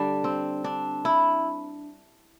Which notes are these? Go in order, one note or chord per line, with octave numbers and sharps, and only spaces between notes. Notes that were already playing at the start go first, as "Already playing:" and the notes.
Already playing: D3 G3 D4
C4
D4
E4